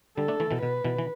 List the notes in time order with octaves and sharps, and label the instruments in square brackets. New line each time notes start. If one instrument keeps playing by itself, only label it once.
[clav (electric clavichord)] D3 G3 [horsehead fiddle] A4
[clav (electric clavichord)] A3 D4
E3 A3
B2 E3
[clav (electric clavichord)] B2 [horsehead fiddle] B4
[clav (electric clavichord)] B2 E3
E3